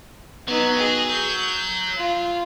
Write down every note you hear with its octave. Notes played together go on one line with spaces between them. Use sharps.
F#3 B3 D#4
G#4
G6
F4